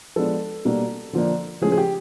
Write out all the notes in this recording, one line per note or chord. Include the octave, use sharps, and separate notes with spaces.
F3 G#3 B3 D4 A4
B2 G3 A#3 D4
D3 F3 A#3 D4
C#3 F3 A3 C#4 G#4
G#4
G4